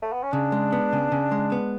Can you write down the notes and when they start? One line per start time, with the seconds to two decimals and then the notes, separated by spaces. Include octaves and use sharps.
0.02 A3
0.12 B3
0.23 C#4
0.32 C#3 D4
0.52 G#3
0.72 B3
0.93 C#3
1.12 C#3
1.32 G#3
1.52 B3